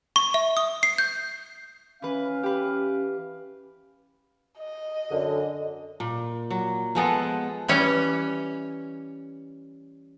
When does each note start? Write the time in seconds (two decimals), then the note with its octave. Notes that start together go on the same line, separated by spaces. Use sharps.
0.16 C#6
0.34 E5
0.57 D#6
0.83 C7
0.98 G6
2.02 E3 C#4 B4 F5
2.43 G4 B4
4.59 D#5
5.11 F#2 D3
6.00 A#2
6.51 F#3
6.95 F3 G#3 B3 A4
7.68 E3 G3 C#4 C#5